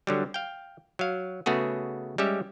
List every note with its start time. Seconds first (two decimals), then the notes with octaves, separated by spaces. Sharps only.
0.07 D3 F#3 G3
0.34 F5 G5
0.99 F#3 F5
1.46 C#3 A3 B3 F#4 G#4
2.18 G3 G#3 C#4 G4 E5